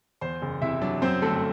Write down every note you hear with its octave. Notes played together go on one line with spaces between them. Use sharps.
E2 C5 C6
F#1
C3 E4 E5
F#3 D4 D5
F#2 C4 C5
G1 A3 A4